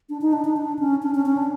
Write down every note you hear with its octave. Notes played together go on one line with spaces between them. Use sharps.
D4
D#4
D4
D#4
D4
C#4
D4
C#4
C#4
D4